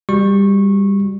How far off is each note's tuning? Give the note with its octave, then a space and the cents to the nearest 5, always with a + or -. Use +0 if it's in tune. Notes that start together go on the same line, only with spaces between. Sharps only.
G3 +20 F#4 +0 C#6 -20